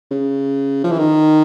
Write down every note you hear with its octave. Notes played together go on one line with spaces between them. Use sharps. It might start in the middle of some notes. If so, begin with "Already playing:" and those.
C#3
F3
E3
D#3